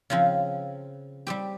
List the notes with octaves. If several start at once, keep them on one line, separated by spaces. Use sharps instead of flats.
C#3 F3 C4
G3 C4 G4